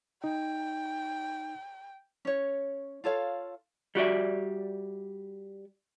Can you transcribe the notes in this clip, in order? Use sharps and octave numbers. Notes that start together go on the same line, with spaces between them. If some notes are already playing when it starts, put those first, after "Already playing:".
D#4 G5
C#4 C#5
F4 A4 C#5 F5
G3 F#4 D5 E5